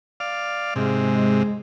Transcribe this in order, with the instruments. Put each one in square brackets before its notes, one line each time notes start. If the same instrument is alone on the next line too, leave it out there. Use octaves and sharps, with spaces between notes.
[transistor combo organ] D5 F5
[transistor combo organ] G#2 C3 [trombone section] G#3